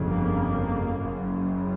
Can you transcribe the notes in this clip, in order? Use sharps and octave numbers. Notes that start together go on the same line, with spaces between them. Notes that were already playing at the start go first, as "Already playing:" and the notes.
Already playing: G1 F2 C#3
A#3
F#1 F#2 C#3